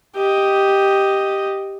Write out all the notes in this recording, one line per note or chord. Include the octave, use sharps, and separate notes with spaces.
G4 D#5